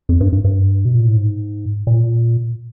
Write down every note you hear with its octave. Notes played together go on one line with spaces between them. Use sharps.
F2
G2
G2
G2
B2
A#2
A2
G#2
A#2